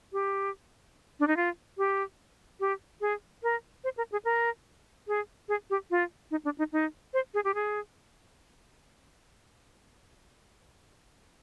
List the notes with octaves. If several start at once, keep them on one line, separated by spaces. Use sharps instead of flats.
G4
D4
D#4
F4
G4
G4
G#4
A#4
C5
A#4
G#4
A#4
G#4
G#4
G4
F4
D#4
D4
D#4
D#4
C5
G#4
G4
G#4